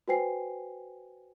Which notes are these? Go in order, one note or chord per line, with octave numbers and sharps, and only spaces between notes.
F#4 B4 C5 G5 G#5 C7